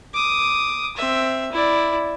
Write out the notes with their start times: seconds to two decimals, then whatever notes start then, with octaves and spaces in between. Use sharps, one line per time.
0.14 D6 D#6
0.96 C4 E5
1.51 E4 D5